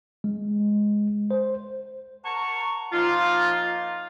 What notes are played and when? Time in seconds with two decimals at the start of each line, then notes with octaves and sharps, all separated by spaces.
0.24 G#3
1.31 C5
2.25 A#4 F#5 A5 A#5 C#6
2.93 F3 A#3 D#4 F4